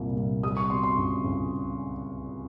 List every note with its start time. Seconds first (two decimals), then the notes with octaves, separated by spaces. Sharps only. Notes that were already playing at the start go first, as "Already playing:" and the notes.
Already playing: C2 A#2 G3
0.17 C2
0.43 G3 D#6
0.57 C#6
0.70 B2 C6
0.83 C6
0.97 C#2
1.24 C#2